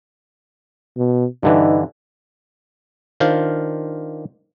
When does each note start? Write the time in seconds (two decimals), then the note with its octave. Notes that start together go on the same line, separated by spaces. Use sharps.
0.97 B2
1.43 G2 D3 E3 D#4
3.20 D#3 D4 F4 C5 F5